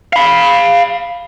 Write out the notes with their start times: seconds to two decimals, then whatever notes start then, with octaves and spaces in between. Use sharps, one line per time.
0.13 F5 B5